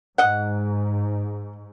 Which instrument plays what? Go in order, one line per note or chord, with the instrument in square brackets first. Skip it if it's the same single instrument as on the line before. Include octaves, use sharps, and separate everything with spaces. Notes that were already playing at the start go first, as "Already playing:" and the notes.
[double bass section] G#2 [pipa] D#5 F#5